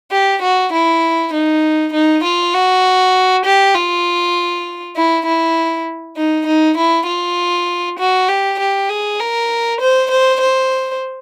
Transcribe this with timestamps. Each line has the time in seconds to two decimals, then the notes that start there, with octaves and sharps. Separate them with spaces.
0.11 G4
0.42 F#4
0.73 E4
1.33 D#4
1.93 D#4
2.24 F4
2.54 F#4
3.45 G4
3.75 F4
4.97 E4
5.26 E4
6.17 D#4
6.47 D#4
6.77 E4
7.07 F4
7.99 F#4
8.28 G4
8.59 G4
8.89 G#4
9.19 A#4
9.80 C5
10.11 C5
10.41 C5